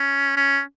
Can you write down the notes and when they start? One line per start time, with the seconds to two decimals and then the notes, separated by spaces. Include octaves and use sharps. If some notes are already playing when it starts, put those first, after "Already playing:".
Already playing: C#4
0.36 C#4